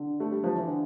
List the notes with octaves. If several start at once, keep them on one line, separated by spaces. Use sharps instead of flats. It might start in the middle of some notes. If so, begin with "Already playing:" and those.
Already playing: D3
A3
G3
F3
E3
D3